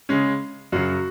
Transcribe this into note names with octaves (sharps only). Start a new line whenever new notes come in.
C#3 G#3 C#4
F#2 C#3 F#3 F#4